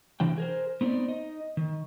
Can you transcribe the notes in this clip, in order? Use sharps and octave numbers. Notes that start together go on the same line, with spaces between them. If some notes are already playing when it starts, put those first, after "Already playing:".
C3 E3 D4 G5
G#4 A#4 C5
B3 C4 D#4 C#5 D5
D#4 D#5
D#3